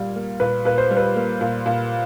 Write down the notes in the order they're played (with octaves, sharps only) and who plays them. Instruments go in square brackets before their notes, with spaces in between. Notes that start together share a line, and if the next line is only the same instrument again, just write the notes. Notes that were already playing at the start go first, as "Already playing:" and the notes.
Already playing: [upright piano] A#2 G3
A#3
[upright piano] A#2 [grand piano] B4
[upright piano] A#2 [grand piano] B4
[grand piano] C5
[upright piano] G3
[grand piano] B4
[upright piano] A#3
A#2
A#2